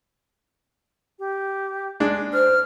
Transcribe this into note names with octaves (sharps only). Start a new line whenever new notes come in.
G4
G#3 D4
C5 F6